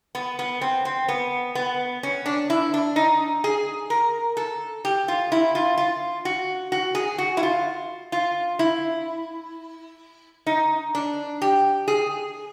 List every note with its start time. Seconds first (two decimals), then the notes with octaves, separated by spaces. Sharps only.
0.15 B3
0.39 B3
0.61 C4
0.85 C4
1.08 B3
1.55 B3
2.03 C#4
2.26 D4
2.50 E4
2.74 D4
2.96 D#4
3.44 G#4
3.90 A#4
4.37 A4
4.85 G4
5.08 F4
5.32 E4
5.55 F4
5.78 F4
6.25 F#4
6.72 F#4
6.95 G#4
7.18 F#4
7.37 E4
7.43 F4
8.12 F4
8.59 E4
10.46 D#4
10.95 D4
11.42 G4
11.88 G#4